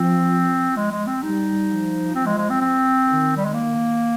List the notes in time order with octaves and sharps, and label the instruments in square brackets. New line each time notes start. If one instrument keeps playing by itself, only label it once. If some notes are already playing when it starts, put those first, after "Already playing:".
Already playing: [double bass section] F3 [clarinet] C4
[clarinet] G#3
G#3
C4
[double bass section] G3 [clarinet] D#4
[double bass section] F3
[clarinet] C4
G#3
G#3
C4
C4
[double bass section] D#3
[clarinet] G3
G#3
A#3